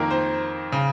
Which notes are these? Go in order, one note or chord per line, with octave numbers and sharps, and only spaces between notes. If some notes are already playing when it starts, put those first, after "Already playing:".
Already playing: F2 D#3 A#3 A#4
C5
C#3